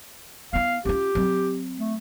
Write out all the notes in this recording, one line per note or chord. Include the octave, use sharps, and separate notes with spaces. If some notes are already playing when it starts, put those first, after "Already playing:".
B3 E4 F5
C#4 F4 G4
F#3 C4
A3